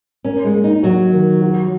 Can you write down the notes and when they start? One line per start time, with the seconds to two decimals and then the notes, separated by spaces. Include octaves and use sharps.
0.24 C#4 A#4
0.44 G#3
0.54 A#3
0.64 D#4
0.83 F#3 F#4
1.12 D#3
1.42 F#4